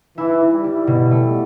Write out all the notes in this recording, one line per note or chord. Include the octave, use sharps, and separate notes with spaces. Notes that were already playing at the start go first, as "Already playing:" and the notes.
E3 E4
E4
G3
E4
B2
A3